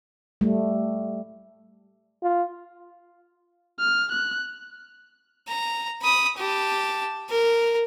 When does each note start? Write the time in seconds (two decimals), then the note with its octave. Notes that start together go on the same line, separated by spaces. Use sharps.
0.41 G3 A3
2.23 F4
3.80 F6
4.12 F#6
5.48 A#5
6.02 B5 D#6
6.38 G4 A5
7.30 A#4